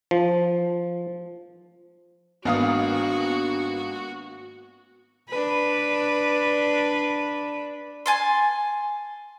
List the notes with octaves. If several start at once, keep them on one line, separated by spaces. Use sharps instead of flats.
F3
G#1 A#3 B3 D4 F#4 F5 D#6
D4 B4
G#5 A5 C6